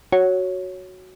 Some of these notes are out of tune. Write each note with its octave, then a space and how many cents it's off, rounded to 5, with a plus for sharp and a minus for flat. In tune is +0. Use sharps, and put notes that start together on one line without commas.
F#4 +0 C#5 +0